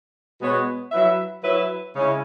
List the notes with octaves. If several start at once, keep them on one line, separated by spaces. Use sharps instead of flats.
B2 G#3 B3 F#4 C#5
F#3 E4 B4 E5
F#3 E4 B4 E5
C#3 G#3 C#4 E4